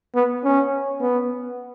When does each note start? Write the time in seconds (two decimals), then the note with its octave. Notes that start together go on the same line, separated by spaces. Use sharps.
0.15 B3
0.44 C#4
1.01 B3